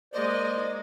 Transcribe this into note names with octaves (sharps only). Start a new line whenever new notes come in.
G#3 A#3 C5 D5 D#5